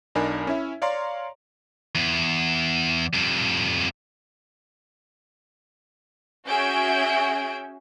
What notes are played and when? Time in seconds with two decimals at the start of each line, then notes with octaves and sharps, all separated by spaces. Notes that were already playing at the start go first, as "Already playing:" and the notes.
0.15 B1 D4 D#4 A#4 G#5 B5
0.47 C#4 E4 E5
0.82 C#5 D5 F5 A#5 C6
1.95 E2
3.14 F2 G3
6.47 C#4 F#4 G#4 E5 G6 D7